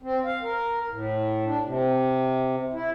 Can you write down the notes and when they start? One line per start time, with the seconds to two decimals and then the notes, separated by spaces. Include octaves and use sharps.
0.03 C4
0.24 F5
0.42 A#4
0.89 A2
1.45 D4
1.65 C3
2.73 E4